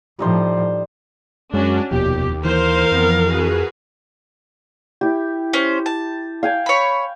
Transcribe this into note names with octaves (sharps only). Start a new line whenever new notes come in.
A2 F3 G3 D#4 C5
F#2 G#3 C#4 D4 F#4
F1 D#2 B2 F3 G4
E3 A#4 C5 F5
F2 B3
F#4 G#4 B4
E4 G4
C#4 C5
A5
F5 G5 G#5
C#5 B5